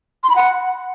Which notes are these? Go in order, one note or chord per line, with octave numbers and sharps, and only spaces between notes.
C6
B5
F#5